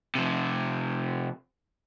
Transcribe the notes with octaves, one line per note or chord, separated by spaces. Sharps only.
C3 F3